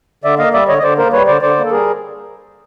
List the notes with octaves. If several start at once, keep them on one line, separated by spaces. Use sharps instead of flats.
D3 D5 E5
A#3 D#5 F5
G3 D5 E5
D3 C#5 D#5
D#5
D3 C5 D5
A#3 A#4 C5
G3 B4 C#5
D3 C5 D5
D3 C5 D5
A#3
A4
G3 G#4 A#4